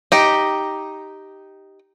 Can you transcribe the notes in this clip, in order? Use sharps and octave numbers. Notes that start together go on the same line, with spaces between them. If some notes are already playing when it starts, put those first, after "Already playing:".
D#4 G4